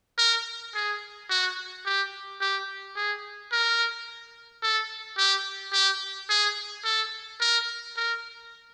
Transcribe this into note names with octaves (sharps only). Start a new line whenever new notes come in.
A#4
G#4
F#4
G4
G4
G#4
A#4
A4
G4
G4
G#4
A4
A#4
A#4